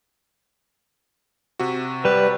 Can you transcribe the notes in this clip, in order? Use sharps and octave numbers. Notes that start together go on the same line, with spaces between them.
C3 F#4
G3 B4